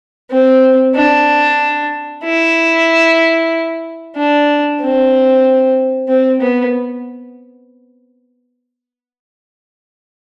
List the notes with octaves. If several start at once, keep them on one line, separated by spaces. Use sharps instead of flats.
C4
D4
E4
D4
C4
C4
B3